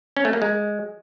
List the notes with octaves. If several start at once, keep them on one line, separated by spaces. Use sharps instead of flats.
C#4
A3
A#3
G#3